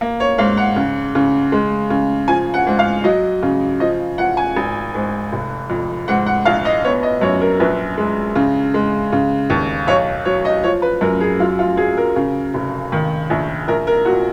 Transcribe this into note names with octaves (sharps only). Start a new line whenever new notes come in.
A#3
C#5
G#2 F5
F#5
C#3
C#3
G#3
C#3
F3 G#5
F#5
G#2
F5
F#3 D#5
C#3
F3 D#5
F3 F#5
G#5
G#1
G#2
F1
F2
G#2 F#5
F#5
A#1 F5
D#5
B3 C#5
D#5
F#2 C#5
A#4
A#1 B4
G#3
C#3
G#3
C#3
D#2
B1 C#5
F#3 C#5
D#5
F3 C#5
B4
F#2 A#4
G#4
F#3 F4
F4
F#3 G#4
A#4
C#3
F1
D#3
A#1
A#1 A#4
A#4
A#2 F#4